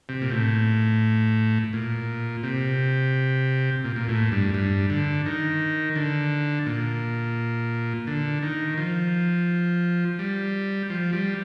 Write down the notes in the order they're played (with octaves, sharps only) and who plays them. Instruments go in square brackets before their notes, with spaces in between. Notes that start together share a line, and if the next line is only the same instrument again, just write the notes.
[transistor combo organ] C3
A#2
A2
A#2
C3
A#2
A#2
A2
G2
G2
D3
D#3
D3
A#2
D3
D#3
F3
G3
F3
G3